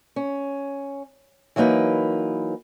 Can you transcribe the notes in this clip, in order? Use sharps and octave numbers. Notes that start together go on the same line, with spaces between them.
C#4
E3 F#3 A#3 D#4 B4